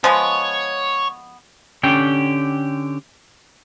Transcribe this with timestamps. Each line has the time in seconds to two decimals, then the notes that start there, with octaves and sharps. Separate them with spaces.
0.04 F3 G#3 B3 C#5
1.83 D3 C#4 G4 G5